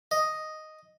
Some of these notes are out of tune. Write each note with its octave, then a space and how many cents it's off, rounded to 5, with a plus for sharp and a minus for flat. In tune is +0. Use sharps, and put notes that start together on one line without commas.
D#5 +0